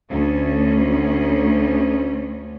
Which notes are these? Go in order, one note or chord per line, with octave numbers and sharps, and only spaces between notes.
D2 C#4